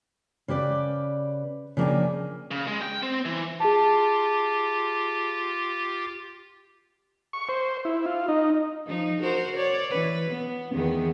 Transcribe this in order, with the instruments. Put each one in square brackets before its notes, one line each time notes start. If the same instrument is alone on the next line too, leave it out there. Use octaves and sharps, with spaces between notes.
[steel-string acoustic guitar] C#3 G4 B4 D5
C#3 F3 A#3 D4 G5 G#5
[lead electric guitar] C#3
G#3
G5
C4
E3
[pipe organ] F4 G4 [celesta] G#4 A5
[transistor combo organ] C#6
C5
E4
F4
D#4
[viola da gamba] F3 D#4
F#4 A#4 C5
C#5 D5
E3 B4
B3
E2 D#3 B3